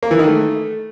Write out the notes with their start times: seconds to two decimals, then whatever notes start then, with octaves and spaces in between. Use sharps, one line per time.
0.03 A#3
0.11 E3
0.19 D#3
0.27 A3